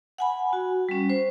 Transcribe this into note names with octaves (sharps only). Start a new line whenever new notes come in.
F#5 G#5 B5
F#4
G3 C#4
C5